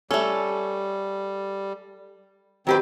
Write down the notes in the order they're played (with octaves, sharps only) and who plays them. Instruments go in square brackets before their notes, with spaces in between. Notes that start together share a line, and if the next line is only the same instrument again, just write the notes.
[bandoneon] G3 [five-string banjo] A3 C#4 [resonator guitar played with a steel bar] A4
[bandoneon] D#3 C4 [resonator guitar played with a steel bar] F#3 G4 B4